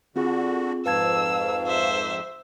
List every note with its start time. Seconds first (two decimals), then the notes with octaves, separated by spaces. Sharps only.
0.16 D3 C4 F4 F#4 G#4
0.86 F2 G#2 B4 F5 A5 E6 G#6
1.67 C5 E5